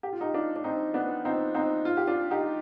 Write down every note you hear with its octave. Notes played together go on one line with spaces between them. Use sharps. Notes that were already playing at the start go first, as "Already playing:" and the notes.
G4
F4
D#4 G4
D4 F4
D4
C4 D#4
B3 D4
C4 D#4
C4 D#4
F4
G4
D4 F4
D#4 G4